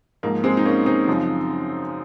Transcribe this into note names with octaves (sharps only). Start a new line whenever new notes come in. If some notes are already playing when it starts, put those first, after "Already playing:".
G#2 F3 A#3
G#3 C4
D#4
A#3 C#4
C4 D#4
F#2 C#3 F3